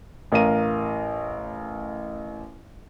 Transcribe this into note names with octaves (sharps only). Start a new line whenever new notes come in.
A1 A#4 F5 A#5 D#7